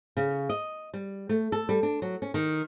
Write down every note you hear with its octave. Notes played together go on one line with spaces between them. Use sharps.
C#3
D#5
G3
A3
A4
G3
D4
F#3
C#4
D#3